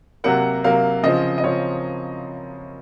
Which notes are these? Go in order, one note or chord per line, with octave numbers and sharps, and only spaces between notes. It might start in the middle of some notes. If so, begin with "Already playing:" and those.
C3 F#3 A#3 F#5
C3 F#3 A#3 F5
C#3 F3 C4 D#5
D#5
C#3 F3 C4 C#5